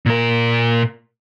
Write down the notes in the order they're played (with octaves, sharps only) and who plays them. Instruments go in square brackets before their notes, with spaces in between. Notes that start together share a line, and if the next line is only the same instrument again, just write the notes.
[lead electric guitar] A#2 A#4